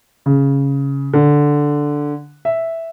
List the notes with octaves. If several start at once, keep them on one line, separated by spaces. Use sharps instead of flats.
C#3
D3
E5